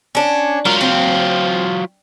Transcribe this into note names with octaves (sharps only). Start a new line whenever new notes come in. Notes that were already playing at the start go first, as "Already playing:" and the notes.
C#4 D4
F#3 F4 A#4
C4